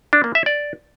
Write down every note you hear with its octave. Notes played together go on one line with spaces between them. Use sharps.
D4
A#3
E5
D5